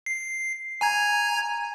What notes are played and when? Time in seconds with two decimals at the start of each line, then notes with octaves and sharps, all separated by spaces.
0.06 C7
0.81 G#5 A#5 G#6